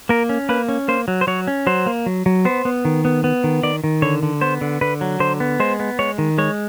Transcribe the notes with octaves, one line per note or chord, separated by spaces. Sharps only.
A#3 A#4
C#4
A#3 B4
C#4
A#3 C5
F#3
C5
F#3 C#5
C#4
F#3 C5
A#3
F#3
F#3
B3 C5
B3
D#3
B3
B3
D#3
D#3 D5
D#3
D3 C#5
D3
B3 C5
D3
D3 B4
F#3
D3 C5
B3
G#3 C5
B3
G#3 C#5
D#3
G#3 C#5